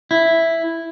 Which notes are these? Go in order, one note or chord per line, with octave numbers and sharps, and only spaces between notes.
E4